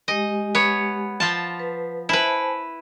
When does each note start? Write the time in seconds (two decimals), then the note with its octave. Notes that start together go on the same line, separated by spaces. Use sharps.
0.08 G#3 G4 D#5 G#5
0.55 B3 C#5
1.20 F3 F4 A5
1.59 B4
2.09 E4 B4 C5 G#5 A5